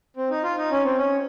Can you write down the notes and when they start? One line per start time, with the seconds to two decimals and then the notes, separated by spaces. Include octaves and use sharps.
0.16 C4
0.30 D#4
0.43 F4
0.57 D#4
0.71 C#4
0.84 C4
0.98 C#4